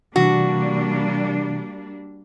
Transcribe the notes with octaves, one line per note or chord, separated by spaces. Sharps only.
C3 E3 G3 A#3 D4 F#4